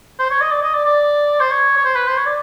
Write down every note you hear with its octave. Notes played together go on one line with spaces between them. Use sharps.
C5
C#5
D#5
D5
D#5
D5
D5
C5
C#5
C#5
C5
B4
C5
C#5
D5